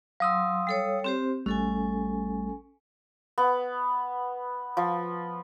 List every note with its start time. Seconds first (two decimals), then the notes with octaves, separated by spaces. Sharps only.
0.20 F#3 F5 C6 D#6 E6
0.67 G3 A4 C#5
1.04 C4 G4 C5
1.46 A1 G3 A3 C#4 A4 G#5
3.38 B3
4.77 F3